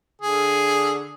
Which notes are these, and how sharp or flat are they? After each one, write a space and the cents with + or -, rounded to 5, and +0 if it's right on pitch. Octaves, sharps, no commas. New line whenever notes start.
D3 +0 G#4 +0